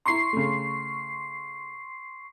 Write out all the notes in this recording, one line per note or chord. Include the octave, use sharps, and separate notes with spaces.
E4 A#5 C6 C#6 C7
C#3 A3